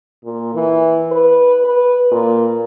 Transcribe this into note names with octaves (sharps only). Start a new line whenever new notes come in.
A#2
E3
B4
B4
A#2